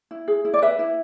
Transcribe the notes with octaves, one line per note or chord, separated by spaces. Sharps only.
E4
G#4
E4
D5
B4 E5
E4